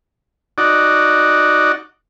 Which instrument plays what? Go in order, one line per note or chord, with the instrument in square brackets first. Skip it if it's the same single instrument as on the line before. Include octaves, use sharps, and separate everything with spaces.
[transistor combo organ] D#4 F#4 D5